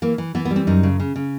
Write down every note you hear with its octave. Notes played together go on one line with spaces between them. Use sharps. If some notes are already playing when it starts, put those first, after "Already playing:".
E3 A#3
E3
E3 B3
B3
G3
C4
F#2 D#4
C#3
C#3
C#3